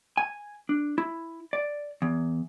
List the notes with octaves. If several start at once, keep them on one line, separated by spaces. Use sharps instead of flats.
G#5
D4
E4
D5
E2